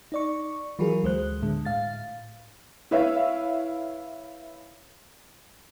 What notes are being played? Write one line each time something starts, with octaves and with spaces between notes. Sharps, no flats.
D#4 D5 C#6
E3 F#3 F4 F#4 G#4 A#4
D2 G#3 C5 F#6
A2 D3 G#3
A2 F5 A6
E4 B4 C#5 E5 F5